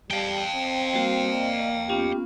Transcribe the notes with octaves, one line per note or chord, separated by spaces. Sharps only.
G3 F5 G5 A5
C4
G3 A#3 F#4
D5 D#5
B3 C#4 F4 G4